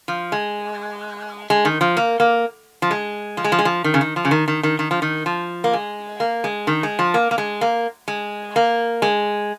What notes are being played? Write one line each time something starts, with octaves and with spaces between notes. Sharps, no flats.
F3
G#3
G#3
D#3
F3
A#3
A#3
F3
G#3
F3
G#3
F3
G#3
F3
D#3
C#3
D#3
F3
C#3
D#3
D#3
D#3
D#3
F3
D#3
F3
A#3
G#3
A#3
G#3
D#3
G#3
F3
A#3
A#3
G#3
A#3
G#3
A#3
G#3